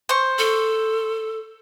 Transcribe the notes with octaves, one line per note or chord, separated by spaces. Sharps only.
C5 C#6
A4